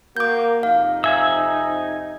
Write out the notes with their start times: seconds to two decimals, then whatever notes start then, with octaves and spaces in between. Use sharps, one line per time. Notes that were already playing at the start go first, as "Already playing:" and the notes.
0.17 A#3 F#4 D6 G6
0.63 F2 C3 D#4 F5
1.04 E5 G#5 E6